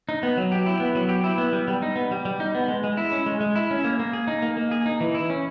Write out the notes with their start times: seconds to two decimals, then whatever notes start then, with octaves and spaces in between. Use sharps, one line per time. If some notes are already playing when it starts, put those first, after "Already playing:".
0.09 D#4
0.23 B3
0.37 F#3
0.52 G4
0.66 E4
0.80 B3
0.95 F#3
1.09 G4
1.24 E4
1.38 B3
1.53 G3
1.68 G3
1.82 D#4
1.96 B3
2.11 G3
2.25 G3
2.40 D#4
2.55 B3
2.68 G#3
2.84 G#3
2.97 E4
3.12 C#4
3.26 G#3
3.41 G#3
3.56 E4
3.71 C#4
3.84 A#3
4.00 A#3
4.13 G#4
4.28 D#4
4.42 A#3
4.57 A#3
4.71 G#4
4.86 D#4
5.00 E3
5.14 E4
5.30 C#4